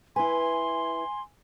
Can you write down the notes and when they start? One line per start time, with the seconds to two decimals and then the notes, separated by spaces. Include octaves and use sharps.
0.16 E4 B4 G#5 C6